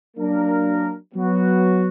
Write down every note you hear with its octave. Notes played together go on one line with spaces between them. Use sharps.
F#3 A#3 D4 A#4
F#3 B3 F#4